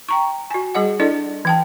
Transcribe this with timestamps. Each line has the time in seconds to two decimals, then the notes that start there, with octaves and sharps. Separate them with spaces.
0.09 G5 A#5 C#6
0.50 F#4 G#5
0.75 G3 G#4 D#5 F#5
1.00 D4 E4 A4 D5 D#5
1.45 E3 G5 A5